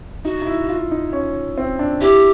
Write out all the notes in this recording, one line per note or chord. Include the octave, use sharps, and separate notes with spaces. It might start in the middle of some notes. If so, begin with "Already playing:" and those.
D#4 F#4
D#4
E4
F4
D#4
C#4
C4
D4
E4 G4